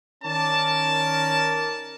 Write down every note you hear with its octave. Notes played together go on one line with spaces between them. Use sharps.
D#3 C#4 A#4 D5 A5